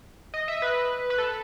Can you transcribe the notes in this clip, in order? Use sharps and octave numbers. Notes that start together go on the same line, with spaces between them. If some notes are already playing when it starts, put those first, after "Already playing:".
D#5
E5
B4
B4
A4